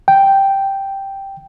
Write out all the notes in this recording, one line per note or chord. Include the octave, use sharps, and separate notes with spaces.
G5